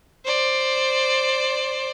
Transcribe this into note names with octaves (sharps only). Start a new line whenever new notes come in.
C5 D5